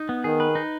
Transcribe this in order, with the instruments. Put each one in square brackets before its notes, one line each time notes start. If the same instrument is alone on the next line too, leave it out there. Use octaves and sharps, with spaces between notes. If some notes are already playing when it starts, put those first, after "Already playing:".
Already playing: [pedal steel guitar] D#4
B3
[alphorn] D#3 [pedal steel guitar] G#4
[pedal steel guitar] B4
D#4